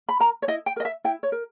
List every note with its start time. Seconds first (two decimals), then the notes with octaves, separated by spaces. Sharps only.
0.09 B5
0.20 A#4 A#5
0.42 C#5
0.48 E4 D#5
0.66 G5
0.76 A#4 D#5
0.85 E5
1.04 E4 G5
1.23 C#5
1.32 A#4